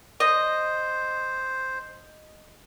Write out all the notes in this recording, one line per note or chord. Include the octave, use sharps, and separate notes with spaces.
C5 D#5